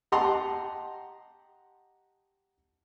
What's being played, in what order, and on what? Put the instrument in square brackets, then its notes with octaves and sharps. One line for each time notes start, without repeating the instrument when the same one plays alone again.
[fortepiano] G4 D#5 F#5 A5 A#5 C6